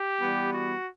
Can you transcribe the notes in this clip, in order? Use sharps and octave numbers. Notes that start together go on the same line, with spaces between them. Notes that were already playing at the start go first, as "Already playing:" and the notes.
Already playing: G4
E3 G3 B3
F#4